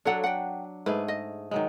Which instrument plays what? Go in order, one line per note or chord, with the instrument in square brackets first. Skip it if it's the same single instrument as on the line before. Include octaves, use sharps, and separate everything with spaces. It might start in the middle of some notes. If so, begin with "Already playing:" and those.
[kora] F#3 D4 [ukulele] A4 C#5 F#5
[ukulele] F#5 G5
[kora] G#2 A3 G#4 [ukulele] B4
[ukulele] D#5
[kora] D#3 F#3 G#3